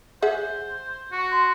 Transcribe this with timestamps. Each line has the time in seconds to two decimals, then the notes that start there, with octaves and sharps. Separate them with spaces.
0.22 G#4 C5 E5 F#5
1.12 F#4
1.32 C6